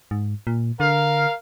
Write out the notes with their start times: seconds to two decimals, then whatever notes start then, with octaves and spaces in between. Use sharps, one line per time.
0.11 G#2
0.47 A#2
0.80 D3 A#4 F5